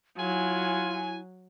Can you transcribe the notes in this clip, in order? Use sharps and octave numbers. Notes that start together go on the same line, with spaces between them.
F#3 E4 F4 G#5